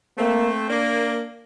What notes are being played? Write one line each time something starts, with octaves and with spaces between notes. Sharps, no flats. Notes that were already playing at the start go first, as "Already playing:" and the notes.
A3 A#3 C4
A#3 D4